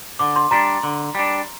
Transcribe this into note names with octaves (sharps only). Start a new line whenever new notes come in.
D3 D6
C6
G3 D4 A#5
D3
G3 D4